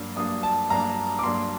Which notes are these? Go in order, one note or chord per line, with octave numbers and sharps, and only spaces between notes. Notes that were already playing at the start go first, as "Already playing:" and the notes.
Already playing: G2 F#3 A#3 D4
G2 F#3 A#3 D4 D#6
A5
G2 F#3 A#3 D4 A#5
D6
G2 F#3 A#3 D4 C6